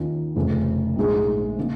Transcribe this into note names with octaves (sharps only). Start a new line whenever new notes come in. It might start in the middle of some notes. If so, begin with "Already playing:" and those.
Already playing: D#2 D#3 C#4 F4
F1 F2 C#3
A#1 G#2 G#3 D#4 G#4
C#3 A#3 D#4